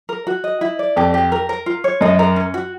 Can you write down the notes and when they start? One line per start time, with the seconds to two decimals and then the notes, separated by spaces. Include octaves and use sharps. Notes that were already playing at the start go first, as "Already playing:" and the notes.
0.09 A#4
0.27 F#4
0.44 D#5
0.61 E4
0.79 D5
0.96 F2 G4
1.14 G4
1.32 A#4
1.49 A#4
1.66 F4
1.84 C#5
2.01 F#2 D#5
2.19 A#4
2.36 C#4
2.54 F#4